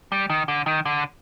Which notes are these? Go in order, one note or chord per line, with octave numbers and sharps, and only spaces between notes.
G3
D#3
D3
D#3
D3